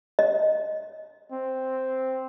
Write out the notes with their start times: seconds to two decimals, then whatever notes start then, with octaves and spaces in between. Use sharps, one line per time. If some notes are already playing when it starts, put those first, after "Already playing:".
0.19 D#5
1.32 C4